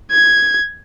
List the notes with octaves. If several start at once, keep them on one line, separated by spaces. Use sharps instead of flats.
G#6